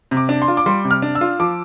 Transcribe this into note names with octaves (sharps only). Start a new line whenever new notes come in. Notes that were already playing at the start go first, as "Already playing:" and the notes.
C3
D6
D4
C6
F4
D6
G3 C6
C3
F6
D4
E6
F4
F3 D6